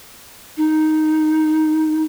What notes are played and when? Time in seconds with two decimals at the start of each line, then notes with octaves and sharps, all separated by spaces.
0.57 D#4